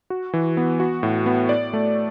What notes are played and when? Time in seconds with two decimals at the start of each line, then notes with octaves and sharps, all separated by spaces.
0.10 F#4
0.33 E3
0.57 B3
0.80 F#4
1.03 A2
1.26 B3
1.49 D5
1.73 A3